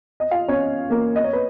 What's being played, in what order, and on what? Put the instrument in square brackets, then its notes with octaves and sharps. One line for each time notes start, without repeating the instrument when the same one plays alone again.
[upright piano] D#5
F4 F5
C#4 C#5
A#3 A#4
D#5
C#5
B4